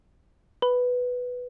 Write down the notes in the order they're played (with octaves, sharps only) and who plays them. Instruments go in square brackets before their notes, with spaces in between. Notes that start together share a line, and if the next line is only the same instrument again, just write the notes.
[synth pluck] B4